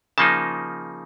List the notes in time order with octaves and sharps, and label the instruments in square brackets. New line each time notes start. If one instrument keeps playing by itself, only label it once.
[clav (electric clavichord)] C#3 F3 A#3 D#4 A5